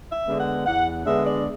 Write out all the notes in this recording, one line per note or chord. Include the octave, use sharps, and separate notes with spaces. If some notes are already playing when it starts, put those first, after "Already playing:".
E5
D3 G#3 B3 D4
F#5
E2 F#5
D3 G#3 B3 D4 E5
D5